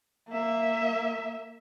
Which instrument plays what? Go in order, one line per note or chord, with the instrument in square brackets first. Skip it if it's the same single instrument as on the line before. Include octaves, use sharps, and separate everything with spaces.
[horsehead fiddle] A#3 E5